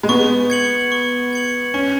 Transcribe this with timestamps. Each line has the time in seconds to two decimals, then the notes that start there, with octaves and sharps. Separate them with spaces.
0.03 G#3
0.09 B3 C#6
0.50 G#6 C#7 F#7
0.92 C#6
1.33 G#6 C#7 F#7
1.74 C#4 C#6